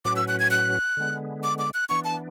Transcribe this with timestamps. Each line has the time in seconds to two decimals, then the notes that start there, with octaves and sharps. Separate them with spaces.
0.05 A2 F#3 C#4 F#4 B4 D6
0.16 E6
0.28 F#6
0.40 G#6
0.51 F#6
0.97 D3 G#3 B3
1.43 D6
1.59 D6
1.74 F#6
1.89 E3 B3 D4 C#6
2.04 A5